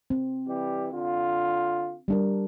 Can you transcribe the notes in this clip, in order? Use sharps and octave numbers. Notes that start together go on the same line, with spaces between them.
C4
E3 G3 G4
D3 F4
G3 D4 A#4